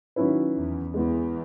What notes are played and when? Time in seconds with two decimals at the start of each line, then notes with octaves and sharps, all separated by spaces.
0.16 D#3 F#3 C#4 E4 B4
0.55 E2
0.94 E2 G#3 B3 E4